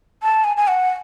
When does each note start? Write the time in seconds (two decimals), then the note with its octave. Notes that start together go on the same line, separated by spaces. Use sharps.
0.23 A5
0.44 G#5
0.57 G#5
0.68 F#5